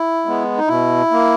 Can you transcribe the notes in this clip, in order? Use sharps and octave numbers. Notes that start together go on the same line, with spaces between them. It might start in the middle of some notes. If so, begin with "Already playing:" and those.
Already playing: E4
G#3 B3
D#4
B2 E4
A#3